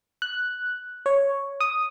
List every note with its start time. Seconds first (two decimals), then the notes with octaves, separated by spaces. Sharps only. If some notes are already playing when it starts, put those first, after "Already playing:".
0.22 F#6
1.06 C#5
1.60 D#6